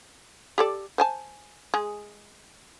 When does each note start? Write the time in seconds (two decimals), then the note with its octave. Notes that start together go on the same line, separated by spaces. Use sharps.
0.58 G4 A4 D5
0.98 C5 G#5 A5
1.74 G#3 G#4